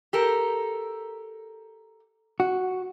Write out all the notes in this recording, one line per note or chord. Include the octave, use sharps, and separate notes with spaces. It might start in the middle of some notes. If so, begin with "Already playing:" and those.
G4 A4 A#4
F#4